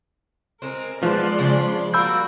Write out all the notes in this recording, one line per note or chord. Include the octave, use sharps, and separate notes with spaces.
G#3 C4 A#4
F3 G#3 B3 C5 D5 C6
C#3 D4
G3 A#3 F#4 B5 E6 G6